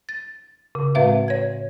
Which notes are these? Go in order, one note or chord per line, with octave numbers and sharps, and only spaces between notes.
A6
C#3
A2 G#3 C4 B4 E5 F5
C#5 G#6